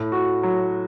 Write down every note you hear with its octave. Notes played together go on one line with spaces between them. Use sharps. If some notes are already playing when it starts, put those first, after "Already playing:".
Already playing: A2
F#4
F#3